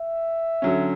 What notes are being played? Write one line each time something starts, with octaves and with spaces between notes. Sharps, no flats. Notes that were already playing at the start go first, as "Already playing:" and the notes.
Already playing: E5
D3 F#3 C#4